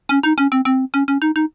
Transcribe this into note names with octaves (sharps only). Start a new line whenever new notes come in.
C#4
D#4
C#4
C4
C4
C#4
C#4
D#4
D#4